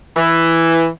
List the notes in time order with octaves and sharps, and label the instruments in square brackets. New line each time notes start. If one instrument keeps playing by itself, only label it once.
[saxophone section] E3